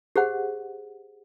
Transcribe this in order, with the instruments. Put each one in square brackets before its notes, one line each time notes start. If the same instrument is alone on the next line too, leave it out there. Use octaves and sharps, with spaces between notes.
[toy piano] G4 G#4 C5 F#5